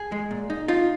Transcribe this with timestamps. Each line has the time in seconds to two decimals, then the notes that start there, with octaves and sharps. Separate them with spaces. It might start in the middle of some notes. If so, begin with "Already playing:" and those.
Already playing: G#4
0.12 G#3
0.31 A#2
0.50 D#4
0.68 D#4 F4